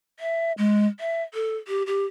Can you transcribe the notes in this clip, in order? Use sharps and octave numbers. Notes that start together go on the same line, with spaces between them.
E5
G#3
E5
A4
G4
G4